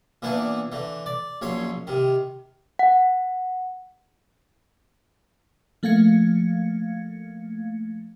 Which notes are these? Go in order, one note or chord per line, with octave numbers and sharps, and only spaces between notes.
A#2 E3 B3 D4 E4
D3 E3
D5
A#1 F#2 C#5 B5 C6
C3 D#3
F#5
F3 A3 A#3 F5 G#6 C#7